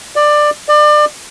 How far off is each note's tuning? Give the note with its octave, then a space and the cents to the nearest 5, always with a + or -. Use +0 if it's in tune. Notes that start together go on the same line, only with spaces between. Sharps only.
D5 +15
D5 +30